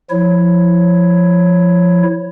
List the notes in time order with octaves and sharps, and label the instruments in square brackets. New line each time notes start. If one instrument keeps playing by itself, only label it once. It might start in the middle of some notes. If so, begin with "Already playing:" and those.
[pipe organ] F3 E4 C#5